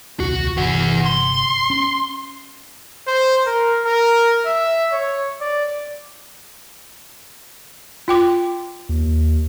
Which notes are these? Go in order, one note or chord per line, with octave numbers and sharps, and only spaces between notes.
D#1 C2 F#4
G1 C3 E3 B3 F#5
C6
C#4
C5
A#4
A#4
E5
C#5
D5
F4 G5 D6
D#2